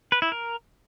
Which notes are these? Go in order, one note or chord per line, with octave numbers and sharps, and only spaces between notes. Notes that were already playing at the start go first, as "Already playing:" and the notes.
B4
E4
A#4